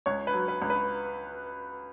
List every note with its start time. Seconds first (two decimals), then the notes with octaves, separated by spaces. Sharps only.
0.06 C#2 C#5
0.27 B4
0.33 F#3
0.48 B4
0.62 C#2
0.70 B4